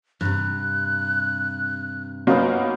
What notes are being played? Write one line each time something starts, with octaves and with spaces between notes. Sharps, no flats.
G2 C3 F#6
F#3 A#3 B3 C#4 D#4 F4